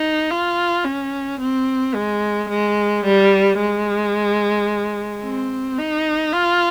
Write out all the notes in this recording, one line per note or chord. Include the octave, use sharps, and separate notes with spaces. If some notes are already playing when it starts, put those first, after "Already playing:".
Already playing: D#4
F4
C#4
C4
G#3
G#3
G3
G#3
C4
D#4
F4